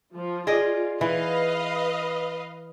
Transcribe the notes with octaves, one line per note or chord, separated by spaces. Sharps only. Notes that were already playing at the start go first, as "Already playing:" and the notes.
F3
F4 G#4 D5 D#5
E3 B4 D#5 F5